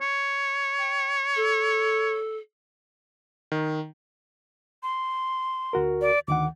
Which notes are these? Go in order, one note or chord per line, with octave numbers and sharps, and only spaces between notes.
C#5
G5
A4
D#3
C6
D2 F#4 A#4
D5
D2 D#3 F#5 D6